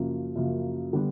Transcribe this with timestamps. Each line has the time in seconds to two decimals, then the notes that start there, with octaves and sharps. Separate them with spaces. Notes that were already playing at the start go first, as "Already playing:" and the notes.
Already playing: F#2 C#3 F3 A#3
0.36 F#2 C#3 F3 A#3
0.93 D3 G3 B3 D4